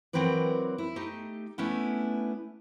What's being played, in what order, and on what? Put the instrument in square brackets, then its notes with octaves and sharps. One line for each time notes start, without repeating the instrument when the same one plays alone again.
[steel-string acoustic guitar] E3 F#3 C4 A#4 B4 D5
E4
A3 D#4 G4
A3 B3 C#4 D4 E4